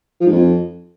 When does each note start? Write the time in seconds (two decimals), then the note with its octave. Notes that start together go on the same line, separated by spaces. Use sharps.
0.20 F3
0.26 G#2
0.32 F2